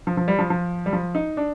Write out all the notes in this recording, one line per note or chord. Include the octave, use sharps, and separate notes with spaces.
F3
F3
G3
F3
F3
G3
F3
D#4
D4